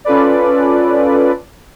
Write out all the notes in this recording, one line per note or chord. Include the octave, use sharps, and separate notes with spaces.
C#4 F4 A4 B4 D5